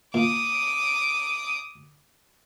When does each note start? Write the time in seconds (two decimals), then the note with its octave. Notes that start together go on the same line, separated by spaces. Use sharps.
0.14 A#2 D6 D#6